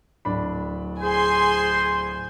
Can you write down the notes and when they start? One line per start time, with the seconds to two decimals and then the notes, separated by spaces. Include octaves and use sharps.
0.25 D1 D4 B5
1.02 G#4 C5 G#5 C6